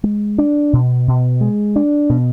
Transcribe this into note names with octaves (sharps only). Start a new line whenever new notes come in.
G#3
D4
B2
B2
G#3
D4
B2